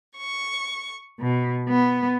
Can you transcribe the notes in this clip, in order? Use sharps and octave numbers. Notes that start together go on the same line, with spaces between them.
C#6
B2
B3